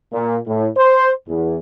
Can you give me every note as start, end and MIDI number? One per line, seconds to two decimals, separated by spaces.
0.13 0.36 46
0.47 0.66 45
0.76 1.09 72
1.28 1.57 40